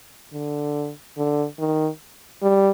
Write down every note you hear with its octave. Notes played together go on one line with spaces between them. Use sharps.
D3
D3
D#3
G3